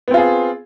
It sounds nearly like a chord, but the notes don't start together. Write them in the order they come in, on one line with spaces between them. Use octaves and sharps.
B3 C4 F4 G#4